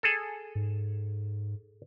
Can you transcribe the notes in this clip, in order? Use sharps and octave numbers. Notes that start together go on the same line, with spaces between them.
G#4 A4
G#2